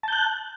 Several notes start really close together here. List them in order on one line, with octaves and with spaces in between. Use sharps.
A5 G6 F#6